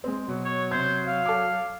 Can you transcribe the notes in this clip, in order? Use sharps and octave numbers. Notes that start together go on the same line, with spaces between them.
G#3 C4
B2 F#3
C#5
C3 C5 G#6
F5
A4 D6